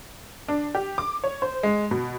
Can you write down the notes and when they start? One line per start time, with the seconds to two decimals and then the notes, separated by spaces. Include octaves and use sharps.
0.48 D4
0.75 G4
0.98 D6
1.24 C#5
1.42 C5
1.63 G#3
1.91 B2